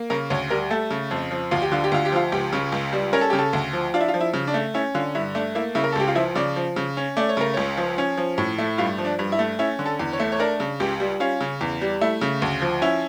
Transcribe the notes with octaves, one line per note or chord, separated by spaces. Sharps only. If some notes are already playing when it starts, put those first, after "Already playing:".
Already playing: A#3
C#3 A#4
D2 C#5
G3 A#4
A3 A4
C#3
F2
F3
D2 F4
G4
D3 F4
G4
D2 F4
G4
F3 F4
C#2 G4
C#3
C#2
G3
C#4 A#4
A4
C#3 G4
A4
D2
F3
D4 F4
E4
F4
F3
E4
C#3
D4
A3
C#4 E4
D3 F4
G2 E4
A3 D4
A#3 E4
C#3 E4
A#4
A4
C#2 G4
F4
F3 E4
C#3 D5
F3
C#3
C#4
A3 D5
C#5
C#3 A#4
C#2 C#5
F3
C#4
F3
A2
A3
G2 F4
F3
D4
G2
E4
A3
C#4 E4
D3
A4
E2
C#5
A3
C#5
D4 A#4
C#3
C#2 G4
G3
C#4 F4
C#3
E2
G3
A3 E4
C#3
D2
F3
C#4 E4